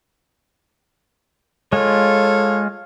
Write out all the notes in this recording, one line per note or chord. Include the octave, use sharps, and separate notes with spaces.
G#3 F4 A4 C#5 F5